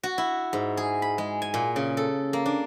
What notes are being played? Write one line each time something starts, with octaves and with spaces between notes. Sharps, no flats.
F#4
E4
G#2
G#4
B5
G#3
G#5
A#2
C#3
A4
A#3
D4